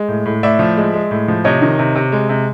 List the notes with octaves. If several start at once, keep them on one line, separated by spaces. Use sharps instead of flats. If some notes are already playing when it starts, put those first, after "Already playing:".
Already playing: G#3
A2
A2
A2 D5 E5
F3
G#3
G#3
A2
F3
C3 C#5 D#5
D#3
C3
C3
G#3
C3